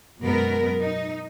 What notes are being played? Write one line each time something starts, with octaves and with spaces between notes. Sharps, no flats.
F#2 B2 G#3 B3 A#4
D#4